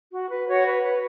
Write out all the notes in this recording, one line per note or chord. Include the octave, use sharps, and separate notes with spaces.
F#4
B4
F#4 C#5 F#5
B4
B4